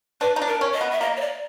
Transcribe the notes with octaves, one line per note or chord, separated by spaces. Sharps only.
D4 B4
D#4
D4
A#4
C#4
D#5
B3
E5
A#3 D#5
C#5
D5